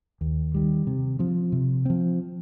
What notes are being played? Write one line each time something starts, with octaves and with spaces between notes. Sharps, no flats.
D#2
D#3 G3
C3
F3 C4
C3
F3 C4